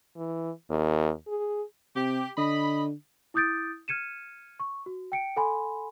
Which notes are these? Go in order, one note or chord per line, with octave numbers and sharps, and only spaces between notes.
E3
D#2
G#4
C3 G4
D3 D#5 B5
E4 D6 D#6 G6 A6 D7
F6 G#6 C#7 D#7 E7
C#6
F#4
G5 C#7 D7
A4 F#5 G#5 B5 C6